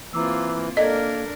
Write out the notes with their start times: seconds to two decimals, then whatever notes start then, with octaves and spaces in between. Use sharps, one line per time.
0.13 E3 A#3 C4 F4 A#5 D6 E6
0.77 A#3 D4 A4 A#4 D5 D#5 G#6